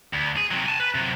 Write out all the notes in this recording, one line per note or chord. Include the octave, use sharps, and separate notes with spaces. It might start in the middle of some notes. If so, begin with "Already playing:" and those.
D2
G#4
C3 F#3
G#5 A5
B4
C3 F#3